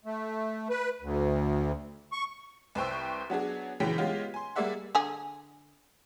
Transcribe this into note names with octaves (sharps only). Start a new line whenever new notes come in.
A3
B4
D2
C#6
C2 B4 C5 G5 C#6 E6
F#3 B3 D4 G#4
A#1 C#3 E3 F#3 G5 B6
G#3 B3 C#4 F4 G4 G#4
G#5 C6
G3 A#3 G#4 D5 E5 F#5
D3 G#4 G#5